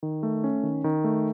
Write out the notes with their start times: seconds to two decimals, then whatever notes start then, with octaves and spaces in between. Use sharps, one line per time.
0.03 D#3
0.23 A3
0.44 C#4
0.63 D#3
0.84 D#3
1.04 A3